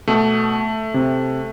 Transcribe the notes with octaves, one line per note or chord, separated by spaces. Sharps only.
B2 A3
C3